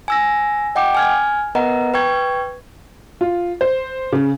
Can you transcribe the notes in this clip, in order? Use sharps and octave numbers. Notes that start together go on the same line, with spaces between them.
G#5 E6 A#6
D#5 F#5 G5 D6
G#5 F6 G#6
B3 A#4 B4 D#5 F#5 A#5
B4 G5 C#6 G#6
F4
C5
C#3